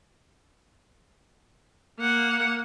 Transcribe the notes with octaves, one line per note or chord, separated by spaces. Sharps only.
A#3 F#5